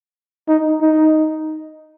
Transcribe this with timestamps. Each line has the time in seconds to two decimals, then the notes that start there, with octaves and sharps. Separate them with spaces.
0.48 D#4
0.81 D#4